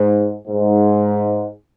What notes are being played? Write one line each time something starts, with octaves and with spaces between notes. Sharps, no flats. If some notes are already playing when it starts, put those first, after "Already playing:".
Already playing: G#2
G#2